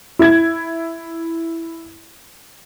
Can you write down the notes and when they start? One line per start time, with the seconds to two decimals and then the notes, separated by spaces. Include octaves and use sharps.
0.19 E4 G#6